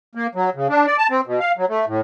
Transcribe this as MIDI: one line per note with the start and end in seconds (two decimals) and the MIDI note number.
0.15 0.27 58
0.35 0.50 54
0.55 0.68 49
0.69 0.86 62
0.86 0.97 74
0.98 1.07 81
1.10 1.21 60
1.27 1.39 47
1.40 1.52 77
1.57 1.65 54
1.69 1.86 57
1.87 2.01 45